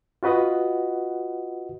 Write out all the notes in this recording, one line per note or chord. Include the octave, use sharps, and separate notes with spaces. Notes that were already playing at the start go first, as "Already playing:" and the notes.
F4 F#4 B4 D#5 F#5